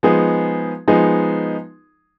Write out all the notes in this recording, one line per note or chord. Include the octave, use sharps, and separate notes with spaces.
F3 G#3 B3 D#4 G#4
F3 G#3 B3 D#4 G#4